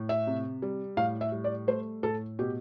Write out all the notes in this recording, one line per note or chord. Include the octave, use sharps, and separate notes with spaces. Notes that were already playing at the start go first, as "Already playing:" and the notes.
Already playing: A2
E5
C3
G3
A2 F5
E5
G3
D5
A3 C5
A2 A4
B2 G4